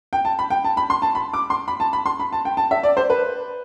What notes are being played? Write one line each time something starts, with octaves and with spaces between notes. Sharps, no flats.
G5
A5
B5
G5
A5
B5
C6
A5
B5
D6
C6
B5
A5
B5
C6
B5
A5
G5
A5
E5
D5
C5
B4